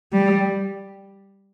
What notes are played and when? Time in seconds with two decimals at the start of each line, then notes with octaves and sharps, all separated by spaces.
0.12 G3